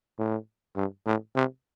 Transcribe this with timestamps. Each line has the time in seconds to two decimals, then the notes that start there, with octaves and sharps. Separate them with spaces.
0.18 A2
0.76 G2
1.06 A2
1.35 C3